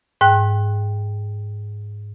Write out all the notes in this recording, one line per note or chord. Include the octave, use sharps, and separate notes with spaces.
G#2 G5 F#6